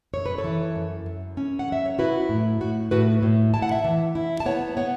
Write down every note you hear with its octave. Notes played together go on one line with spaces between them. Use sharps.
F#2 C#5
B4
A4 C#5
E3
F#2
F#2
C#4
F#5
F#3 E5
C#5
E4 F#4 B4
A2
A2 F#4
A2 F#4 B4
A2
E4 A5
F#5
E5 A5
E3
E4
A5
B3 C#5 F#5
B3 C#5 F#5